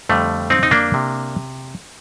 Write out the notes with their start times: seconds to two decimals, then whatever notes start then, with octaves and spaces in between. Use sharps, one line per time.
0.09 F2 D3 G3 A3
0.50 C4 D#4
0.63 D#4
0.71 A#3 D4
0.94 C3